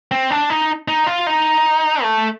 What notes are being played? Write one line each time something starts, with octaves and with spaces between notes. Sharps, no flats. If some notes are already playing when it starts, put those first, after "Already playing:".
C4
D4
D#4
D#4
F4
D#4
A3